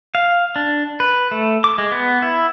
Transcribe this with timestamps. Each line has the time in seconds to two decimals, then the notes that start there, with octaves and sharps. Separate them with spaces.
0.15 F5
0.56 D4
1.00 B4
1.31 A3
1.64 D6
1.78 G#3
1.92 B3
2.22 E4